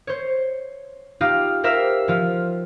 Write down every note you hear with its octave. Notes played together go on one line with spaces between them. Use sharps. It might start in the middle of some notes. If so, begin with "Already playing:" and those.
C5 C#5
D#4 F4 G4 F5
G4 A#4 C5 E5 F5
F3 F4